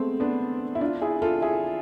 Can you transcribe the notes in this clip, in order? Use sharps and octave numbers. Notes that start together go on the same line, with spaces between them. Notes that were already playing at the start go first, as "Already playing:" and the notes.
Already playing: G#3 A3 B3 C4
B3 D4
E4
D4 F4
E4 G#4
F4 A4
E4 G#4